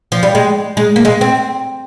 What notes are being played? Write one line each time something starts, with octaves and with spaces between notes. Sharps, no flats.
F3
G3
G#3
G#3
A#3
G#3
C4